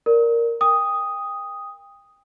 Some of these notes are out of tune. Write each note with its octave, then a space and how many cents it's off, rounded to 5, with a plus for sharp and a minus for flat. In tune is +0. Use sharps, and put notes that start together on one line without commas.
A#4 +0 D5 -5
G5 +30 D#6 +0